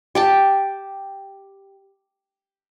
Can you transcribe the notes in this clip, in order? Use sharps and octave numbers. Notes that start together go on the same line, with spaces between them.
G4 G5 A5